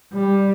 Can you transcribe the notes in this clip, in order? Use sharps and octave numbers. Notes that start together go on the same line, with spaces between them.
G3